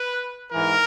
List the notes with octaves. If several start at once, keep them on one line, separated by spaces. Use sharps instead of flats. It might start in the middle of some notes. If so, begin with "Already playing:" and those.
Already playing: B4
G#2 E3 A#4